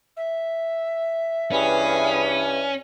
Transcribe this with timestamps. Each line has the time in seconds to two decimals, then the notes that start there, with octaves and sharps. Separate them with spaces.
0.17 E5
1.52 G2 E3 C#4 G#4 B4